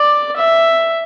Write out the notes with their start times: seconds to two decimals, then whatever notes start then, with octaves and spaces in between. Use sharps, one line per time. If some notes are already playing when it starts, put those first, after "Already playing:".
Already playing: D5
0.36 E5